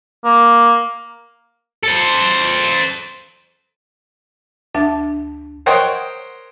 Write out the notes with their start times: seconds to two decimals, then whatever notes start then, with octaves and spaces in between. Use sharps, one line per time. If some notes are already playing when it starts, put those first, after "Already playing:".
0.25 A#3
1.83 A4 C5
4.75 D2 D4 E5 A5 A6
5.66 A#4 C5 C#5 D#5 F#5 G5